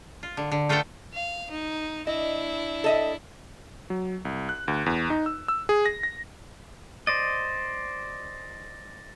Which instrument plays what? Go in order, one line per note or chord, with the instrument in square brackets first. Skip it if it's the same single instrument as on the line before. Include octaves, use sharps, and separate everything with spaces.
[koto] F4
D3
D3
A3 F4 A4 B4 F#5 G5
[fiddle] F5
D#4
[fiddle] D4 E4 [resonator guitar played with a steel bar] D#5
[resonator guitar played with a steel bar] A4 D#5 E5
[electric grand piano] F#3
C2
F#6
D2
E2
D#4
E6
E6
G#4
A#6
A#6
[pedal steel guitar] C5 D5 D#5 [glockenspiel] A6 A#6